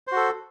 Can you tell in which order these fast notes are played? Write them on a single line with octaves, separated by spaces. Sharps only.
C5 F#4 A4